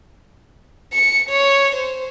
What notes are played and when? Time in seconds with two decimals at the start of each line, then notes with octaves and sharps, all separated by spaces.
0.93 C#7
1.29 C#5
1.76 C5